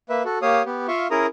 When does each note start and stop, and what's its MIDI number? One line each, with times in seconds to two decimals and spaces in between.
0.10 0.23 58
0.10 0.23 71
0.10 0.23 76
0.25 0.38 66
0.25 0.38 69
0.42 0.62 58
0.42 0.62 67
0.42 0.62 73
0.42 0.62 77
0.42 0.62 87
0.66 0.87 59
0.66 0.87 67
0.88 1.07 65
0.88 1.07 76
0.88 1.07 77
0.88 1.07 85
1.11 1.26 61
1.11 1.26 64
1.11 1.26 68
1.11 1.26 70
1.11 1.26 82
1.11 1.26 87